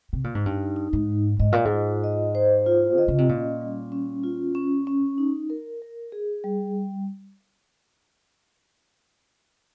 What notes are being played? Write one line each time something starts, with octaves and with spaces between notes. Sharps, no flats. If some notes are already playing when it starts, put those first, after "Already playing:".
C3
A#2
G#2
G2 D#4
D#4
G#2
G#3
G#2 D#5
A#2
G#2
F4
D#5
C5
F4
D#3 D#5
C#3
C3
A#2 C#4
G3
C#4
F4
C#4
C#4
D#4
A#4
A#4
G#4
G3